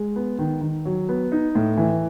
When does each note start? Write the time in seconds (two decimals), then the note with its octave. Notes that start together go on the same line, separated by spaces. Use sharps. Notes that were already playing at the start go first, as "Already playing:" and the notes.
Already playing: G#3
0.16 B3
0.39 D#3
0.61 D#3
0.85 F#3
1.09 B3
1.32 D#4
1.55 A2
1.77 E3